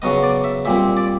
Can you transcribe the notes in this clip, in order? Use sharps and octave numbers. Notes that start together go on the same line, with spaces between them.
C#3 F#3 B3 D#5
D5
E5
A#2 G3 C4 E5
D5